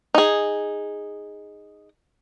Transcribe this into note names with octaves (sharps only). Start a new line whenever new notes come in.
D#4 G#4